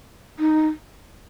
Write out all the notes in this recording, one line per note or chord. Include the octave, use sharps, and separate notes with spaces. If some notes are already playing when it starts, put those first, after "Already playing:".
D#4